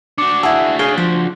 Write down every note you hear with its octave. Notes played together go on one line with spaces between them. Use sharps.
D4 F#4 D6 C#7
E4 G#4 F#5 A5 E6
G#4 C#5 F5 G7
F3 C5